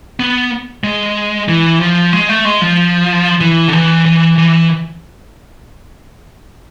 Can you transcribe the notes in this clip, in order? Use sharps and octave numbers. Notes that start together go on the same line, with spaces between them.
B3
G#3
E3
F3
G#3
A3
G#3
F3
E3
D3
E3
E3
E3